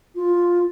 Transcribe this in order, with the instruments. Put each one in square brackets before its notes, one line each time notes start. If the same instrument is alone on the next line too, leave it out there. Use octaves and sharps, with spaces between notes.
[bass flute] F4